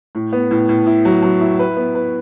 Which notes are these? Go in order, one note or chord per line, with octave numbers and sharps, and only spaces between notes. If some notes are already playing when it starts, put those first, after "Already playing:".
A2
B3
A2
A2
E4
F#3
F#3
E4
B4
B3
B4